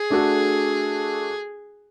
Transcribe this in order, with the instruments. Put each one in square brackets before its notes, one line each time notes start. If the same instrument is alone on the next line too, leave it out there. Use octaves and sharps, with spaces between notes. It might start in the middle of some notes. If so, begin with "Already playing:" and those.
Already playing: [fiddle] G#4
[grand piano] A3 D4 F#4 A4